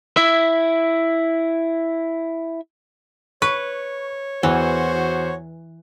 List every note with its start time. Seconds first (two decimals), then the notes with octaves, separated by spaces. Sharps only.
0.17 E4 E5
3.42 B4 C#5 C#6
4.43 E2 E3 F#4 C5